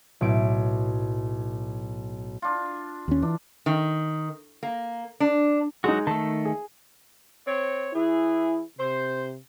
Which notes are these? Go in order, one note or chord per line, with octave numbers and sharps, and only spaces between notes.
B1 A2 D7
D4 F4
D#2 C#4
E3 D4
D#3
A#3
D4
F#3 G#3 D#4 F#4
D#3 A3 A5
G#4
C4 C#5
E3 E4 G#4
C3 C5